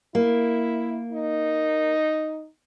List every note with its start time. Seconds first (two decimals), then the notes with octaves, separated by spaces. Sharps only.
0.15 A#3 E4
1.12 D#4